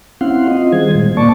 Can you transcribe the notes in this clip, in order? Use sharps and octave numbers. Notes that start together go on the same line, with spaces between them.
C4 C#4 E4 F5 F#5 C6
C4 F4 D#5
D#3 G3 G#4 C5 G#6
A#2 G#3
A#2 A#3 D5 A5 C#6